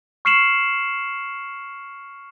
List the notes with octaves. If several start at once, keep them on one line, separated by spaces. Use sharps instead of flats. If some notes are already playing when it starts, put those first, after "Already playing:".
C#6 F6 C7 C#7 E7 F#7